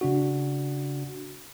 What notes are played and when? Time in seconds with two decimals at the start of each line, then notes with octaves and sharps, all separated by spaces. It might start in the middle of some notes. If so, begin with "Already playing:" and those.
0.01 C#3 D4 F#4